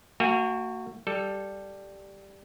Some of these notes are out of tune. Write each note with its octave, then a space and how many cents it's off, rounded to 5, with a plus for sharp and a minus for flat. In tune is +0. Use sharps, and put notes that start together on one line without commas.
A#3 -40 F#4 +0 G#5 -45
G3 +0 A4 +0